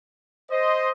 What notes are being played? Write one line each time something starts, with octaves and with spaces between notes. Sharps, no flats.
C5 D#5